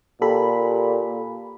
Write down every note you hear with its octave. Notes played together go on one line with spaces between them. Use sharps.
A#2 G4 A4 B5